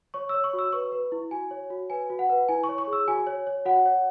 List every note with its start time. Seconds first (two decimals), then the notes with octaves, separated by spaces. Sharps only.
0.14 C#5 C#6
0.29 C#5 E6
0.44 C#6
0.54 F#4
0.59 E6
0.72 B4 C#6
0.92 B4
1.12 E4
1.31 F#4 G#5
1.51 C#5
1.70 F#4
1.90 B4 G#5
2.10 F#4
2.19 F#5
2.30 B4
2.48 E4 G#5
2.64 C#6
2.69 C#5
2.78 C#6
2.87 G#4
2.93 E6
3.08 F#4 G#5
3.27 C#5
3.47 C#5
3.65 F#4 F#5
3.86 C#5